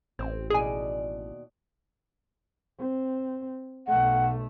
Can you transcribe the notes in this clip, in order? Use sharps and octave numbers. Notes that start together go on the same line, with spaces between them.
A1 C4
D#2 B2 G#4 D5 G#5
C4
B1 A3 F#5